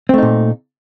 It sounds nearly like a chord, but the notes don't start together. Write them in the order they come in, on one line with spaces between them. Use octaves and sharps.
C4 A3 D#4 A#2